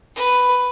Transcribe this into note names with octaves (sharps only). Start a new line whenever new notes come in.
B4